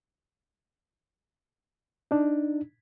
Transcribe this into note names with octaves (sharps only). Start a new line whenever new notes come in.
D4 D#4